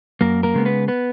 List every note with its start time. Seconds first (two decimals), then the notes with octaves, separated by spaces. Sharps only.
0.21 F#2 A#3 A#4
0.43 A#3 A#4
0.54 C#3 G#3 B3
0.65 B3 B4
0.88 B3 B4